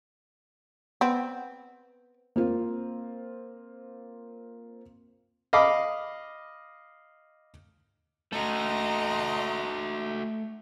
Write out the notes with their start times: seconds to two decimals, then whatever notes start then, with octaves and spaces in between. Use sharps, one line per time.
1.01 B3 C4
2.36 A#3 C4 F4
5.53 D#5 F5 B5 D6
8.32 A3 F#4 A4 D#5 A#5 C6